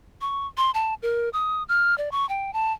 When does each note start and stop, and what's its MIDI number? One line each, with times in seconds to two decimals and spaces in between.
0.21 0.47 85
0.57 0.71 84
0.74 0.94 81
1.02 1.29 70
1.33 1.63 87
1.69 1.97 89
1.98 2.11 74
2.12 2.28 85
2.29 2.53 79
2.53 2.72 81